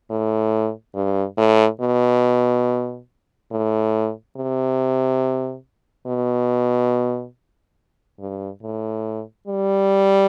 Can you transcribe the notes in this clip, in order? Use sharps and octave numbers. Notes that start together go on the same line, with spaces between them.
A2
G2
A2
B2
A2
C3
B2
G2
A2
G3